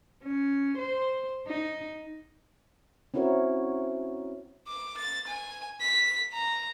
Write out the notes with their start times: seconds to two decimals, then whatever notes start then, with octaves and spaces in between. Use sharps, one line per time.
0.23 C#4
0.78 C5
1.47 D#4
3.14 C4 C#4 E4 F#4 A#4 C#5
4.67 D6
4.97 A6
5.27 G#5
5.81 B6
6.33 A#5